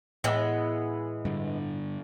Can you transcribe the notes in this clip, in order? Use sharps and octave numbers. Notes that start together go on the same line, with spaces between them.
A2 E3 G#3 B3
G2 D3